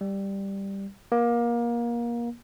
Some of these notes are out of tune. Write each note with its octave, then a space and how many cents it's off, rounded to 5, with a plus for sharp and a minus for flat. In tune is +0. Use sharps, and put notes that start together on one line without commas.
G3 +5
A#3 +25